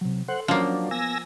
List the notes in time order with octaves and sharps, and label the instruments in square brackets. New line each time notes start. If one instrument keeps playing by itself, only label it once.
[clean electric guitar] C3 F#3
[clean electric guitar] A4 C6 [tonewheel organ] C5 F#5
[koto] F3 A#3 [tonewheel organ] F#3 D4 [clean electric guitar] C#4 C#5
[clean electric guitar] B3 [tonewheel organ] G#5 E6 A#6